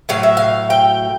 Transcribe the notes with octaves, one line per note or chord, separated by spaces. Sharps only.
A2 F#3 F5
E5
F5
G5